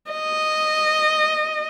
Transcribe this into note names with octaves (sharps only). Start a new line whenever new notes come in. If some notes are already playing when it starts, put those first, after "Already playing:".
D#5